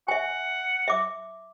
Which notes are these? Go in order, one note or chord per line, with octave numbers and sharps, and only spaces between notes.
E5 F#5 G#5
E5 D6